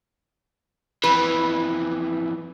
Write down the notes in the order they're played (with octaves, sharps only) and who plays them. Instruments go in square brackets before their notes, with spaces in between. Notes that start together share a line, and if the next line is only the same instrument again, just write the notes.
[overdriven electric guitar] F2 E3 [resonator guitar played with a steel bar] B4